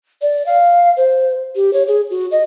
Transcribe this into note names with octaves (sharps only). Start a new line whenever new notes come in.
D5
F5
C5
G4
C#5
G#4
F#4
D#5